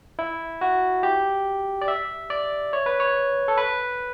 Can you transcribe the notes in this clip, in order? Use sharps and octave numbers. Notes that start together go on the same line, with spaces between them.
E4
F#4
G4
D5
E5
D5
C#5
B4
C#5
A4
B4